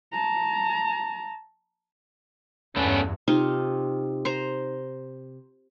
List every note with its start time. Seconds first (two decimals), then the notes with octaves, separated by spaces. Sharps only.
0.12 A5 A#5
2.76 E2 G2 A3 B3 C#4 D4
3.28 C3 D#4 F4
4.25 C5 A#5